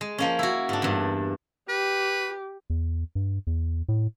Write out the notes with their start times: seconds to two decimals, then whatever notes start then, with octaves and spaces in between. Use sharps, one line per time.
0.01 G#3
0.18 F3 A#3 C#4
0.39 E4 F#4
0.69 G#2 D4
0.82 E2 G2
1.69 G4 B4
2.70 E2
3.15 G2
3.47 E2
3.89 A2